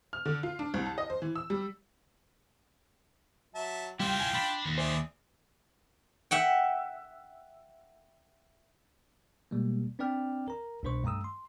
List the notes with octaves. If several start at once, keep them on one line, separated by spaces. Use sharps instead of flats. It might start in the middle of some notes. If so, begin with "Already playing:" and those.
F6
D3
F4
D4
C2
A5
D#5
C5
E3
E6
G3
F#3 E5 A5
G3 E4 F4 C5 G5 C6
G#5
D4 B5
D#2
G#4 C5 D5 E5
E5 F#5 G5
B2 G3 G#3 A#3
C4 D4 B4 D5 G5 F6
A#4 A#5
C2 B2 D4 B4 C5 C#6
G2 A3 A#5 D#6 E6
C6